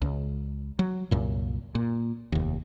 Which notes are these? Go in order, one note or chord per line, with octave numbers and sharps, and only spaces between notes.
C#2
F#3
C2 F#2 A#2
A#2
F1 D#2